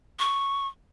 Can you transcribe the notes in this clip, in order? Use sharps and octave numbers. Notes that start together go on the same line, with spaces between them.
C#6